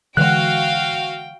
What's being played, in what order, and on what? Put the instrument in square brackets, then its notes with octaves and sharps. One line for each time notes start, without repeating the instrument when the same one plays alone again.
[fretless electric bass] D3 E3 G#3 [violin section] F#4 F5 [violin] G5 [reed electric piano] F#6